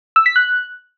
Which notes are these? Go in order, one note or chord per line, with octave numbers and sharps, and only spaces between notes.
E6
B6
F#6